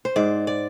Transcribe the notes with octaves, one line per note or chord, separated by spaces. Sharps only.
C5
G#2 D5
D5